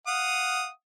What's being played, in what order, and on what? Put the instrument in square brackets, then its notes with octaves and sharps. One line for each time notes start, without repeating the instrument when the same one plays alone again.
[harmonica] F5 F#5 D#6